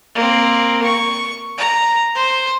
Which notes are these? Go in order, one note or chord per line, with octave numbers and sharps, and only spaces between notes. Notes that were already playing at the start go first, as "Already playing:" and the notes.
A#3 C4
C#6
A#5
C5